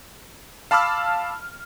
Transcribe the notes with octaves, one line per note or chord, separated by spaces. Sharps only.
F5 A5 B5 D6 E6 F6